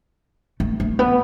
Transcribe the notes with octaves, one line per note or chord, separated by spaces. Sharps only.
A3
A3
B3